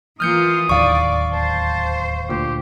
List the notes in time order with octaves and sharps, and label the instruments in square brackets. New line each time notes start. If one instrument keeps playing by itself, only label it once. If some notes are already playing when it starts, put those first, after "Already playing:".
[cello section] E3 A#3 F4 [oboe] D#6 [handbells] F6 G6 C#7
[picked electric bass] D1 D#2 [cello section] D5 [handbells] F5 C#6
[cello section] C5 [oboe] A5
[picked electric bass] D2 A#2 [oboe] G4